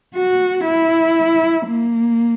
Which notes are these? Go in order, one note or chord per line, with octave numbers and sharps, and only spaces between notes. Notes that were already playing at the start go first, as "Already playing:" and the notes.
F#4
E4
A#3